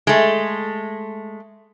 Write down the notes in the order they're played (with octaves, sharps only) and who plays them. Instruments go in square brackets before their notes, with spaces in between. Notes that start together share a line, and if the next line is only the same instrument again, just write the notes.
[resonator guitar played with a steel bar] G#3 A3